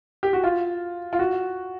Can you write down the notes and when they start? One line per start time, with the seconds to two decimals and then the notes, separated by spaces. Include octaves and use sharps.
0.23 G4
0.33 F#4
0.44 F4
1.13 F4
1.19 F#4